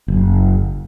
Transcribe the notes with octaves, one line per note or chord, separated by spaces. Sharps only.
F#1